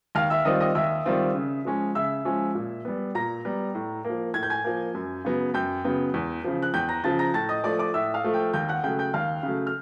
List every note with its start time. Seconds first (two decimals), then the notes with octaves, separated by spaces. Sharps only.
0.15 D#2 F5 F6
0.30 E5 E6
0.45 D#3 G3 C4 F4 D#5 D#6
0.60 D#5 D#6
0.75 D#2 E5 E6
1.05 D#3 G3 C4 F4
1.35 C#3
1.65 F3 G#3 C#4
1.95 C#3 E5 E6
2.25 F3 G#3 C#4
2.55 A#2
2.85 G3 B3
3.15 A#2 A#5 A#6
3.45 G3 B3
3.75 A2
4.05 F3 A#3
4.34 A2 G#6
4.43 G6
4.50 G#5 G#6
4.64 F3 A#3
4.94 F#2
5.25 C#3 F#3 B3
5.54 F#2 G5 G6
5.84 C#3 F#3 B3
6.14 E2
6.44 C#3 F3
6.63 F#6
6.74 E2 G5 G6
6.89 A#5 A#6
7.04 C#3 F3 A5 A6
7.19 A#5 A#6
7.34 A2 A5 A6
7.49 D#5 D#6
7.64 F3 A3 D5 D6
7.79 D5 D6
7.94 A2 E5 E6
8.14 F5 F6
8.24 F3 A3
8.34 G5 G6
8.53 D#2 G5 G6
8.69 F#5 F#6
8.84 C#3 F#3 A3 G5 G6
8.99 G5 G6
9.14 D#2 F5 F6
9.43 C#3 F#3 A3
9.67 F6